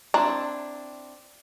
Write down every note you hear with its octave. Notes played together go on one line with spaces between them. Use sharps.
C4 D4 E4 A#5